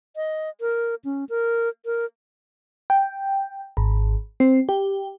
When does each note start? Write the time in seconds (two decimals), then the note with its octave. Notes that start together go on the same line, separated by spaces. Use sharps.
0.16 D#5
0.61 A#4
1.05 C#4
1.29 A#4
1.85 A#4
2.90 G5
3.77 G#1
4.40 C4
4.69 G4